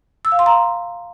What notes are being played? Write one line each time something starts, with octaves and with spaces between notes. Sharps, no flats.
E6
F5
C6
A#5